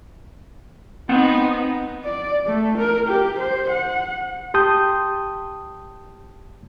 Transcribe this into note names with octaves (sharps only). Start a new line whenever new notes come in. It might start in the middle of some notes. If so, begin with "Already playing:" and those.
B3 C4 D#4 F#5
D5
A3
A#4
G4
C5
F#5
G4 G5 A5 C6 D#6 G6